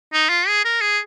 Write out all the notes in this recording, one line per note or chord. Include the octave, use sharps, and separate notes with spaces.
D#4
F4
G#4
A#4
G#4